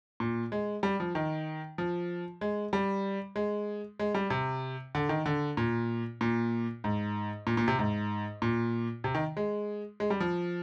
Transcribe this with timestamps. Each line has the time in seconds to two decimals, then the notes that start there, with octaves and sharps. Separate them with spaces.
0.20 A#2
0.52 G#3
0.83 G3
1.00 F3
1.15 D#3
1.78 F3
2.41 G#3
2.73 G3
3.36 G#3
3.99 G#3
4.15 G3
4.30 C3
4.95 D3
5.09 D#3
5.26 D3
5.57 A#2
6.21 A#2
6.84 G#2
7.47 A#2
7.57 A#2
7.68 C3
7.79 G#2
8.42 A#2
9.04 C3
9.15 D#3
9.37 G#3
10.00 G#3
10.10 G3
10.20 F3